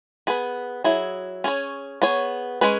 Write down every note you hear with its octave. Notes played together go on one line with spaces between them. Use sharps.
B3 G#4 B4
F#3 E4 G#4
C#4 G#4 C#5
B3 G#4 C#5
G#3 C#4 G#4 B4